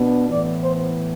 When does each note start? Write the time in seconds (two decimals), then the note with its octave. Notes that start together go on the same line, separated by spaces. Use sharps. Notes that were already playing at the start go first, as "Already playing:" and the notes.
Already playing: B2 B3 D4
0.30 A2 E3 B3 D5
0.61 C5